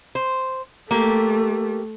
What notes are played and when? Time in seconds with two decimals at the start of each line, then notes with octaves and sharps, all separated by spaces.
0.15 C5
0.91 A3 A#3 G4